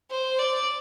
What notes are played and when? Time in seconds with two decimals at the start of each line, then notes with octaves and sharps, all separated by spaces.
0.11 C5
0.39 D5